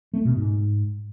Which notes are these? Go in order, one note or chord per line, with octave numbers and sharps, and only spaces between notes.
A3
B2
G#2